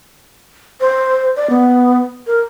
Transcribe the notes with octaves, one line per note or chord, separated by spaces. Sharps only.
C5
D5
B3
A#4